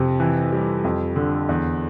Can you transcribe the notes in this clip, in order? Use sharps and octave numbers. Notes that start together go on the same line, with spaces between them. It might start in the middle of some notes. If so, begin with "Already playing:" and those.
Already playing: F2 C3
E3
G3
F2
D3
E2